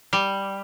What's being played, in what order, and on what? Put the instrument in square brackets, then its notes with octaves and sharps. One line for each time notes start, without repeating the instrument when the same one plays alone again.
[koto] G3